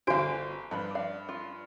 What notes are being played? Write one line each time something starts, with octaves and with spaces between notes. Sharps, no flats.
G1 D4 F#4 C5 F5 D7
G2 F3 B4 B5
D5 F5
F4